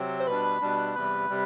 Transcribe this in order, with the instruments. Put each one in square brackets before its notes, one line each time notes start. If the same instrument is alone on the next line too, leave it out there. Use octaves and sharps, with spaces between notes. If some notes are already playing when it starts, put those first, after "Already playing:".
Already playing: [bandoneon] C3 F#3 C4
[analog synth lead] C5
[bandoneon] B2 G3 D4 [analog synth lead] B4
[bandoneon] B2 G3 D4
[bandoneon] E2 C3 G3 [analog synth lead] B4
[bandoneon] C3 G3